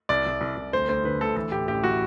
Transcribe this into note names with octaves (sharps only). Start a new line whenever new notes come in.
C2 D5
C2
C2
C2
D2 C5
D2 C5
D3 B4
D2 A4
E3 A4
A2 G4
A1 G4
E3 F#4